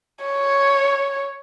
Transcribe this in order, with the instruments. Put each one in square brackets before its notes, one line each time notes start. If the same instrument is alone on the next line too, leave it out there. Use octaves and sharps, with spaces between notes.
[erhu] C#5